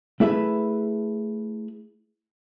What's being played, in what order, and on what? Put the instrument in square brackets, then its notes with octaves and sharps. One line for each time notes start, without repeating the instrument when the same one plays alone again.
[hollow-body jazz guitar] A3 E4 G#4 B4 E5